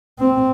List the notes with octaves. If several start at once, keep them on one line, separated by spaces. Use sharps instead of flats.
C4